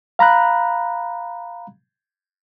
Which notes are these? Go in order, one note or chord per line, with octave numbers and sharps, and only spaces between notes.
F5 A#5 B5 F#6